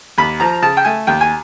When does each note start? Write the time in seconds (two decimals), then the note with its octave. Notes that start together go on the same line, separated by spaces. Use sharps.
0.18 D#2 B5
0.40 F3 A#5
0.62 C#3 A5
0.77 G5
0.85 A3 G#5
1.07 D#2 G5
1.21 G#5